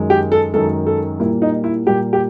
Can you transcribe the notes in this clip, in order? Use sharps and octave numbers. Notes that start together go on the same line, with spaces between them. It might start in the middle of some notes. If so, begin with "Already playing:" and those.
Already playing: F#2 D#3 G#3
G4
A4
F#2 D#3 G#3 A4
A4
A#2 G3 A#3 E4
D#4
E4
A#2 G3 A#3 G4
G4